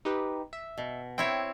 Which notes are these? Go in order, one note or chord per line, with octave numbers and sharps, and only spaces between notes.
D#4 G4 B4
E5
B2
C4 E4 C#5 G5